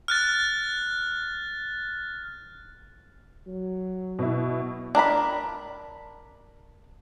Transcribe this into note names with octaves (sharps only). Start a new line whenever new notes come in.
F6 F#6 A6
F#3
B2 E4
D4 A#4 A#5 B5